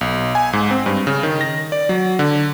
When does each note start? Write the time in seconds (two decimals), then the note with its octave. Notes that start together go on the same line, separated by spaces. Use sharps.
0.01 B1
0.35 G#5
0.53 G#2
0.71 C4
0.86 G2
1.07 C#3
1.23 D#3
1.41 A#6
1.72 D5
1.89 F#3
2.19 D3